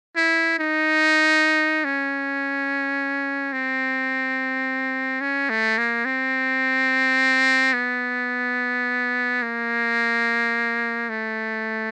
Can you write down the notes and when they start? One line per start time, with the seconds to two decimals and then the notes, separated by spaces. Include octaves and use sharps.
0.16 E4
0.59 D#4
1.85 C#4
3.53 C4
5.21 C#4
5.50 A3
5.78 A#3
6.05 C4
7.73 B3
9.42 A#3
11.10 A3